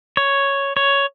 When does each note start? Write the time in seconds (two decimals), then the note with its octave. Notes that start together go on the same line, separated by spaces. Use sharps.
0.17 C#5
0.77 C#5